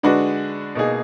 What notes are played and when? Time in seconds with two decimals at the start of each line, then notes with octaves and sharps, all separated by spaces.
0.03 D3 G#3 D4 F#4 B4
0.75 B2 A#3 D#4 G#4